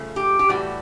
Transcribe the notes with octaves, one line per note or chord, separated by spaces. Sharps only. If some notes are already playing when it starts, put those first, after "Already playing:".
Already playing: C#3 F3 A3
G4
G4
A2 E3 G3 F#4